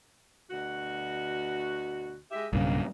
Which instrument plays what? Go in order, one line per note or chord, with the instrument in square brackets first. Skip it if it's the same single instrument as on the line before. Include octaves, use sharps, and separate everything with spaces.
[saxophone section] D2 B2 F#4
G#3 G4 E5
[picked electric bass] B1 G2 C#3 [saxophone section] A#3